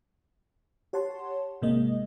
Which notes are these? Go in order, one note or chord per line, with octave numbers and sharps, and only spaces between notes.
G4 C#5 F#5 A5 C6
G#1 G#2 C3 G#3 A#3 D#5